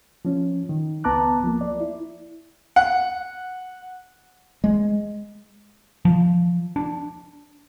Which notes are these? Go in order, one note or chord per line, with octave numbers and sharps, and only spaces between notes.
F3 C#4
D#3
C#2 B3 A5 A#5 D6 F#6
F3 A#3
D5
E4
F#5
G#3
F3
D4